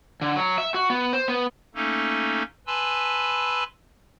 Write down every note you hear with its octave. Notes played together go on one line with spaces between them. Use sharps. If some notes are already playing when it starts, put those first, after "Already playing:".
D3
F#3
E5
F#4
B3
C5
B3
A3 A#3 C#4 D#4 A4
B4 G#5 A5 B5 C6 E6